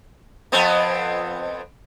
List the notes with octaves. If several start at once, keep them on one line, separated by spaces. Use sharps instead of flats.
F2 B3 C4